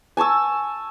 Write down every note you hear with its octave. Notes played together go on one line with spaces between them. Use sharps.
G#5 A5 C#6 E6